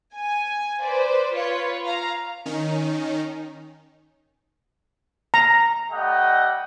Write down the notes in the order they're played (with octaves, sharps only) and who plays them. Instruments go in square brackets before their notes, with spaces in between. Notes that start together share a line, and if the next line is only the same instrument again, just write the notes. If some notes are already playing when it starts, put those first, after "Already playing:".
[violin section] G#5
B4 C5 D5
F4 B4 C#5
F5 A#5
[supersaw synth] D#3 C#4 D#4
[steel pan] A#5
[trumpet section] G3 A3 D#5 F#5 G5